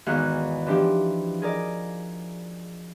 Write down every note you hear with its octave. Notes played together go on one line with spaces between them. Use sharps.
E2 G#2 D#3 F#4 F5 F#6
E3 F3 D4 G4
G#4 A#4 D5 D#5